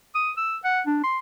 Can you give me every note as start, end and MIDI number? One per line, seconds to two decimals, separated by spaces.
0.15 0.31 87
0.37 0.57 88
0.64 0.81 78
0.87 1.00 62
1.03 1.19 84